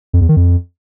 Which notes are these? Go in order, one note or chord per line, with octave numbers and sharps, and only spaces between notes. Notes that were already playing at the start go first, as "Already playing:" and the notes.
F2
E2
D#3
F2